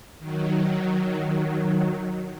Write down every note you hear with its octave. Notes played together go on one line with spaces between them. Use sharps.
D#3 F#3